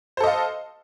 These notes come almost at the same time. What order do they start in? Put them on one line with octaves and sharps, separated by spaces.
C5 A4 D#5 F5